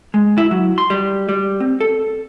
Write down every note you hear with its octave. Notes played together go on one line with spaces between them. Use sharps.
G#3
E4
F#3
C6
G3
G3
C4
A4